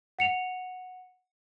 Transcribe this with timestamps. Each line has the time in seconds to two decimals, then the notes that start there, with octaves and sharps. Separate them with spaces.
0.19 F#5 C#7 F7